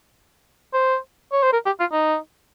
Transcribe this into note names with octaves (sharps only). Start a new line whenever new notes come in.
C5
C#5
C5
A#4
G4
F4
D#4